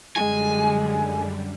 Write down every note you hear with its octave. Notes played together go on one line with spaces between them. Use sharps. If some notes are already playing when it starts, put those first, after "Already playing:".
F#2 D3 G3 G#3 G#5